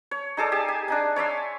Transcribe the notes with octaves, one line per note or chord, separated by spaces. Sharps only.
C#5
D#4 G#4 A4 D5
G4 G#4 G#5 A5
G#5
D4 D#4 G#5
C#5 D5 E5 C6